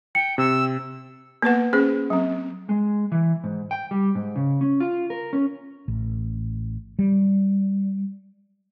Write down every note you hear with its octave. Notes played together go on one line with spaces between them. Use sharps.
G5 C#7
C3 E6
A#3 B3 B4 F#5
C#4 G#4 C5
F#3 C4
G#3
E3
G#2
G5
G3
G#2
C#3
C#4
F4
A#4
C#4
A1
G3